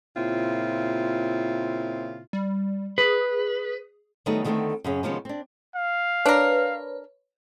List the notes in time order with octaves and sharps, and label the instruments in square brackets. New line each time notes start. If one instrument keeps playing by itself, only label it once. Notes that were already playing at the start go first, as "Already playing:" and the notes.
[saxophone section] A#2 C#3 C4 E4 F4
[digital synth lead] G3
[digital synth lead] G#4 [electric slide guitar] B4
[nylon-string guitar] D#3 F#3 G3 A3 B3 D#4
D3 D#3 G3 A3 B3 C4
F#2 C#3 C#4
C3 D#3 F3 G#3 B3 C#4
C4 D4
[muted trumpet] F5
[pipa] D4 A#4 [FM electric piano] B4 C#5